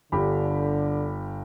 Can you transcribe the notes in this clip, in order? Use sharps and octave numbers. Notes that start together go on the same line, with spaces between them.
G1 D3 G4 B5